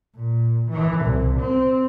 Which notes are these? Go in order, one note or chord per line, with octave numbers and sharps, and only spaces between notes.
A#2
E3
C2
C4